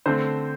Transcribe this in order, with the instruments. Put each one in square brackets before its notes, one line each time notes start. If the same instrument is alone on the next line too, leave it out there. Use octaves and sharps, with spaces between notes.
[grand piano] D3 A3 C4 C5